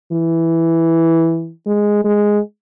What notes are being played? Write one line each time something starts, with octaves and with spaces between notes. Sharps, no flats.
E3
G#3
G#3